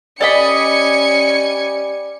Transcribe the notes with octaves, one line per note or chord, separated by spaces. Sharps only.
G3 C#4 D5 D#5 G#5 B5 C#7